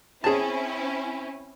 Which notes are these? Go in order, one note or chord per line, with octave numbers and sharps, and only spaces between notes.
C4 C#4 E4 G#4 A5